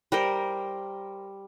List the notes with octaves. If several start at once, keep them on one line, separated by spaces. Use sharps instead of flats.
G3 A#4 C5